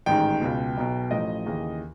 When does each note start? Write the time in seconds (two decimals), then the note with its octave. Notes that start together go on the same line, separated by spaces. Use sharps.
0.06 A1 G#2 D#3 G5
0.41 C#2 B2
0.77 B1 B2
1.11 A1 A2 F3 D#5
1.46 D#2 C#3 E3